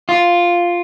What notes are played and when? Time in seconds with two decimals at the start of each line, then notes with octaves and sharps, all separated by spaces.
0.09 F4